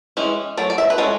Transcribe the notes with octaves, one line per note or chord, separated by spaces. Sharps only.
E3 G#3 C#4
F#3 A3 D5
D5
E5
B4
G#3 C#4 A4